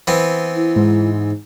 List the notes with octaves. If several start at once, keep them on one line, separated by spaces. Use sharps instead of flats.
E3 B3 C4
E4
G#2